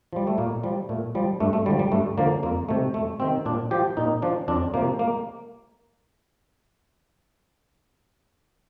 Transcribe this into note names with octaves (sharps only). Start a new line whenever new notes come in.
F3 G3
A3
A#2 A#3
F3 G3
A#2 A3
F3 G3
G2 A3
A3
D3 F3 G3
G3
G2 A3
D3 F3 A#3
F2 A#3
C3 D#3 A3
F2 A3
C3 D#3 C4
A#2 D4
F3 G4
A#2 D#4
F3 D4
F2 D4
C3 F3 A#3
A#3